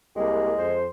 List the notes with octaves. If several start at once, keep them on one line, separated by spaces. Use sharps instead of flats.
C2 G#3 A#3 G4
F2 C5